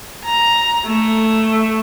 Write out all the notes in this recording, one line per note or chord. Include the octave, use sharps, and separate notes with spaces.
A#5
A3